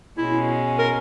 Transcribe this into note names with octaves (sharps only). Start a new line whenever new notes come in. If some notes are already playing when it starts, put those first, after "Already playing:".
B2 G#3 C#4 E4
A#4